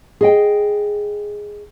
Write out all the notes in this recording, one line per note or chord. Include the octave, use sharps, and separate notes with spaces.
G#4 D#5 G5